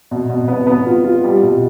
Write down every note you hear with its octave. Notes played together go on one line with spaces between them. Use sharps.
B2
B2
B3
B3
F4
F4
G3
B2